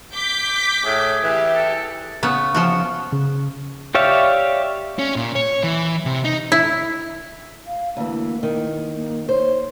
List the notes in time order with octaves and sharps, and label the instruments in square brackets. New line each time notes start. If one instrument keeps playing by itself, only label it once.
[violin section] D6 G6 B6
[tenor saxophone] A2 [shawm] G#4
[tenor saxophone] E3 [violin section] G4
[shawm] A4
[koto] C#3 B3
C#3 F3 F#4
[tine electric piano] C#3
[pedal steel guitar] G4 C#5 D5 E5 F5
[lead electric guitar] C#4
A#2
C#5
E3
C3
D#4
[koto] E4
[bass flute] F5
[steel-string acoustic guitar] D2 E3 [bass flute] A#3
[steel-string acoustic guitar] D#3
[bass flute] A#3
[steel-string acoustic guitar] C5 [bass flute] C#5